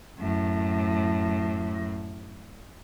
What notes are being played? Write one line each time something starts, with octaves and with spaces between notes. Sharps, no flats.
F#2 A2